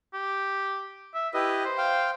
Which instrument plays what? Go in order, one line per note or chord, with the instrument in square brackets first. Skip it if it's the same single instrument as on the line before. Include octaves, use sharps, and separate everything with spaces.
[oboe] G4
E5
[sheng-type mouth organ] E4 G4 B4 [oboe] D#5
[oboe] C5
[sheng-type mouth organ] F5 G5